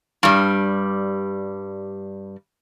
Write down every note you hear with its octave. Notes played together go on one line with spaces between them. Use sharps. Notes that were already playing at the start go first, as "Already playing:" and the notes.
G2 G3